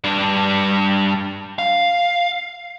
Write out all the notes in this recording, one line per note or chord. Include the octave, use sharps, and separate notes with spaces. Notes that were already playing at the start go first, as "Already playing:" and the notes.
G2 D4
F5